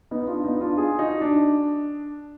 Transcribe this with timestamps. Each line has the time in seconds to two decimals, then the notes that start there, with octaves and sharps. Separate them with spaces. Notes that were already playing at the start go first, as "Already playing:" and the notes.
0.11 B3 D#4
0.27 D4 F4
0.44 B3 D#4
0.61 D4 F4
0.77 F4 G#4
0.99 D#4 F#4
1.21 D4